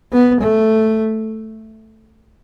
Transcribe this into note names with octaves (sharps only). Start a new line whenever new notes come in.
B3
A3